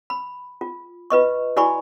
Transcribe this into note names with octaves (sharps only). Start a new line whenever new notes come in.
B5
F4
F4 B4 D#5 C#6
E4 F#4 D5 G#5 B5 C#6